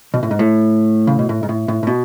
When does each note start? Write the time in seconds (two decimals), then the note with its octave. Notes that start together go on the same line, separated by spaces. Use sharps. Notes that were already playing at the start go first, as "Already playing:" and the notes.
0.14 B2
0.23 A2
0.31 G#2
0.39 A2
1.07 C#3
1.19 B2
1.29 A2
1.43 G#2
1.49 A2
1.68 A2
1.83 A2
1.87 B2